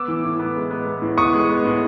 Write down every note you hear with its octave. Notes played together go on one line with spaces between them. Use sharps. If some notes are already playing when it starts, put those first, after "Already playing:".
Already playing: B3 D6 E6
E3
A2
B3
G#3
B3
B3
A2
B3 C#6 D#6
G#3
B3
A2